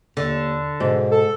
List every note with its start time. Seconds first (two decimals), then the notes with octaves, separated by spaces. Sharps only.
0.17 D#2 D3
0.80 G#2 B2
1.11 A4